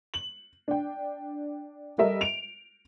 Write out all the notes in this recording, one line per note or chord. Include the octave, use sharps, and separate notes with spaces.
F#7
D4 G5
G3 A4 A#4 D#5 E5
D7 F7